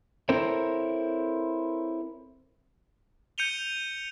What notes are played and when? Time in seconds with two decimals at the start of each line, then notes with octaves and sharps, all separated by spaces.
0.29 C4 E4 A4 A#4 C5 C#5
3.38 G6 C#7 D#7 F7 G7